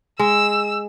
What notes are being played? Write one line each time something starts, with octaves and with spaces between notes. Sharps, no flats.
G#3 E6